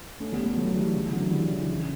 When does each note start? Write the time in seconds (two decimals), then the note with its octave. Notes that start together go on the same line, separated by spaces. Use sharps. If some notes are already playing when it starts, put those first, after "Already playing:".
0.20 A3 C#4
0.32 G3 B3
0.45 G3 B3
0.57 F#3 A3
0.75 E3 G3
0.94 C#3 E3
1.13 D3 F#3
1.31 E3 G3
1.49 C#3 E3
1.68 C#3